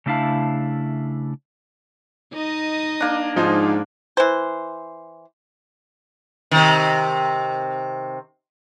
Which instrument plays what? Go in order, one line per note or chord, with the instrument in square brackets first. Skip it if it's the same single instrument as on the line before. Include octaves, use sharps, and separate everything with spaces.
[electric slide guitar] C#3 A3 D4 E4 F5 A5
[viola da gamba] D#4 D#5
[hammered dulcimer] A#3 D4
[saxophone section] G#2 [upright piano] F3 D#4 F4
[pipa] E3 C5
[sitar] C3 D#3